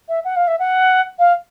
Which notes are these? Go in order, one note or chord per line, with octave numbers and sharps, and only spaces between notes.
E5
F#5
F5
E5
F#5
F5